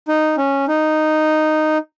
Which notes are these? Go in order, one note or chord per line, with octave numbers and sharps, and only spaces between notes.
D#4
C#4
D#4